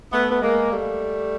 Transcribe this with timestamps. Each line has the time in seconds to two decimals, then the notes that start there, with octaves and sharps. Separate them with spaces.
0.11 A3 B3
0.31 B3
0.41 G#3 A#3
0.72 G3 A3